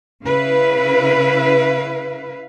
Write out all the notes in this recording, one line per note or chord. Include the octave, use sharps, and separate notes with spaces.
C#3 E4 B4 F5